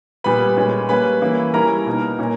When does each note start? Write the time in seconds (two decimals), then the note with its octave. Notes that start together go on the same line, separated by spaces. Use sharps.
0.24 A#2 G3 B3 B4 B5
0.57 A#2 G#3 C#4
0.89 G3 A#3 C#4 B4 B5
1.21 E3 A#3 C#4 E4
1.54 G3 C#4 E4 A#4 A#5
1.86 B2 A#3 D#4
2.18 A#2 A#3 C#4